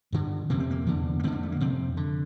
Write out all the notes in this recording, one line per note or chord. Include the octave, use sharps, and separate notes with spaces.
G2 D3
F2 C3 A#3
C4
A#3
E2 D3
A#3
F2 D3 C4
A#3
A3
A#3
F2 C3 C4
D3